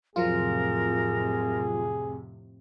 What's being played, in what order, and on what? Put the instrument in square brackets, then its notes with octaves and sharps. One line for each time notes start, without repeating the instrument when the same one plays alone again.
[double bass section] F2 A2 C3 [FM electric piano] F3 F#3 F4 [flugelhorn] G#4 [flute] A#4